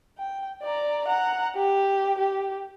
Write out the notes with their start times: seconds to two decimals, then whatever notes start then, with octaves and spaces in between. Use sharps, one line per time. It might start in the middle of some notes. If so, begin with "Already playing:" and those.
0.18 G5
0.63 D5 A#5
1.06 F#5 A#5
1.55 G4
2.18 G4